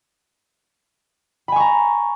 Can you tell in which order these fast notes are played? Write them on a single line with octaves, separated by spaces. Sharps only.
B5 G#5 C#6 A#5